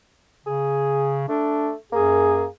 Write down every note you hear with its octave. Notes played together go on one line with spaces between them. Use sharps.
C#3 G#4
A3 D4
F#2 A#3 G#4